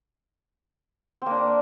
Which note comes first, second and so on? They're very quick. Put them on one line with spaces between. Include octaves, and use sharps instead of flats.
C4 A#3 D4